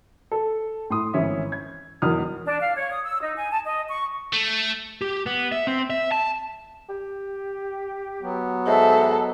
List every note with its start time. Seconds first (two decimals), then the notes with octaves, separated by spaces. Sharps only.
0.32 A4
0.90 A2 C6 D#6
1.14 G#1 E3 C#4 E5
1.52 G#6
2.02 E1 E2 D#3 F#3 D#6 F6
2.46 D4
2.60 F5
2.75 C#5
2.92 D#6
3.04 E6
3.22 D#4
3.36 G#5
3.51 A5
3.65 D#5
3.89 C#6
4.33 A3
5.02 G4
5.26 B3
5.52 E5
5.67 C4
5.90 E5
6.12 A5
6.89 G4
8.21 F#3 B3
8.67 G#2 A4 E5